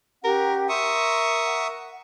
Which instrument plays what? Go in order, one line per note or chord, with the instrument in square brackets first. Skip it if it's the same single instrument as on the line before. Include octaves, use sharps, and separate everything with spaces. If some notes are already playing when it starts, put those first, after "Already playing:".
[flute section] C#4 G4 F#5 [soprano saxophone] A#4
[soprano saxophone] A#4 [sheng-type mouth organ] E5 C#6 D#6 [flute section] C6
[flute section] F#5